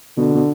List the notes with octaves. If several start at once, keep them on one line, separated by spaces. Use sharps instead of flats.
B2 D3
B2